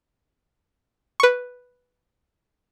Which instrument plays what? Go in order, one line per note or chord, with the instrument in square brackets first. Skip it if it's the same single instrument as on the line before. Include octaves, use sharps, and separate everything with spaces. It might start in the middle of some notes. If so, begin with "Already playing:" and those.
[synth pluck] B4 C#6